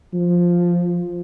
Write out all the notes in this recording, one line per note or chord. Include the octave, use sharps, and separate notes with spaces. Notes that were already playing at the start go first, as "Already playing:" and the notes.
F3